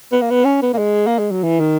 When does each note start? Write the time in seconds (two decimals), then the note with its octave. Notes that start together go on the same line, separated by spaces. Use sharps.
0.12 B3
0.22 A#3
0.30 B3
0.45 C#4
0.62 B3
0.73 A#3
0.78 G#3
1.07 A#3
1.19 G#3
1.31 F#3
1.44 E3
1.60 D#3